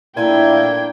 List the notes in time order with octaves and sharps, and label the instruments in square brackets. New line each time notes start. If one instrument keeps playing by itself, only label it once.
[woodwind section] A#2 [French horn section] A3 A#3 E4 [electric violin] D4 G5 [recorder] G#6